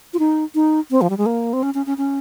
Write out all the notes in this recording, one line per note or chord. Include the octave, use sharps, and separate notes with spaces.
F4
D#4
D#4
C4
F3
G3
G#3
A#3
C4
C#4
C#4
C#4
C#4